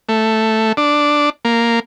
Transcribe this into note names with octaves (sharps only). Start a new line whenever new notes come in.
A3
D4
A#3